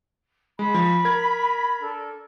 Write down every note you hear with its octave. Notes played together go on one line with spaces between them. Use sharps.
G#3 B5
F3
A#4 G#6
D4 A4